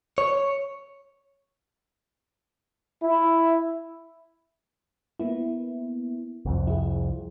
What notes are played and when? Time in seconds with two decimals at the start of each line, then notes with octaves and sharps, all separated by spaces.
0.18 C#5
3.02 E4
5.20 A#3 B3 E4
6.45 C2 F2
6.67 E4 G#4